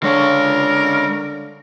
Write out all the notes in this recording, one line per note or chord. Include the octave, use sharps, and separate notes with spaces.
D3 G#3 A#4 C#5